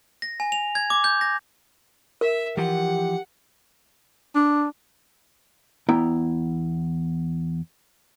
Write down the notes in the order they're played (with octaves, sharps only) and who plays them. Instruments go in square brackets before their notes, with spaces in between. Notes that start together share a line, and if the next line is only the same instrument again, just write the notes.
[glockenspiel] A#6
G#5
F7
G#6
D6
G6
A#6
[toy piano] A#4 [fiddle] E5
[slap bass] E3 F3 [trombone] G4 [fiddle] F#5
[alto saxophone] D4
[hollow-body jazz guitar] E2 B3 E4 G5 A#5